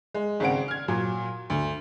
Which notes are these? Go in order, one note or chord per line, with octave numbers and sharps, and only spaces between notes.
G#3
G#1 C#3 C4 F#5 D7
F6 G#6
A#2 F#3
D2